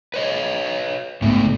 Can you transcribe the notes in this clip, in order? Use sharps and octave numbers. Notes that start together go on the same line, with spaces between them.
B4 C#5 D#5
G#1 G#2 C#3 A3 B3 A4